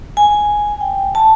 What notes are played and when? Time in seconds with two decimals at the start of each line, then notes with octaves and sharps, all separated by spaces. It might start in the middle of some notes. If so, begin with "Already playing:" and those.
0.17 G#5
0.81 G5
1.15 A5